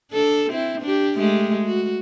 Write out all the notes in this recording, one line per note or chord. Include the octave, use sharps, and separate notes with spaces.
D4 A4
C4 E4
D4 G4
G#3 A3 G4
F#4